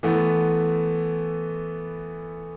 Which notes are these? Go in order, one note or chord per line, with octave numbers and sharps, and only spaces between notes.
E3 A3 B3